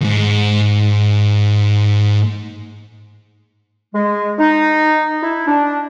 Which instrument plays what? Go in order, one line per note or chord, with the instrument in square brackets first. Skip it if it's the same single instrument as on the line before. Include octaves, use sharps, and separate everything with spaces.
[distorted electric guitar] D#2 G#2
[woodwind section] G#3
D#4
E4
D4